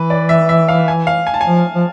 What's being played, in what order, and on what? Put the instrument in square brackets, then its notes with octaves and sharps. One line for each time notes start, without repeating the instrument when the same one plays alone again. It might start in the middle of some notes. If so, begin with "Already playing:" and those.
Already playing: [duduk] E3 [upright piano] B4
[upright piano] D5
E5
E5
F5
G#5
F5
G#5
A5
G#5
[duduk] F3
F3